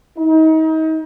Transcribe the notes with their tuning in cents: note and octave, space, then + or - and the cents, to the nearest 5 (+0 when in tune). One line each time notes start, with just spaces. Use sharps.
D#4 +35